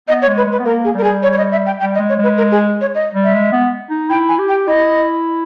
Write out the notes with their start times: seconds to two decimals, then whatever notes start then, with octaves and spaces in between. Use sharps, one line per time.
0.08 B3 D#5
0.22 C#5
0.27 G#3
0.37 B4
0.47 G#3
0.52 B4
0.60 B3
0.65 A#3 A#4
0.84 G#4
0.95 G3 A#4
1.04 G#4
1.23 C#5
1.33 C#5
1.38 D#5
1.52 E5
1.66 G5
1.80 G3 G5
1.95 D#5
1.99 G#3
2.09 C#5
2.19 G#3 B4
2.38 A#4
2.51 G#4
2.81 C#5
2.95 D#5
3.14 G3
3.24 E5
3.34 G#3
3.52 B3
3.90 D#4
4.09 E4 G5
4.29 G#5
4.39 G4
4.49 G5
4.67 E4 D#5